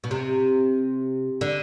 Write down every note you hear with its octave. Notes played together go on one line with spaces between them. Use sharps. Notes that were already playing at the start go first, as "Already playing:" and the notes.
B2
C3
D3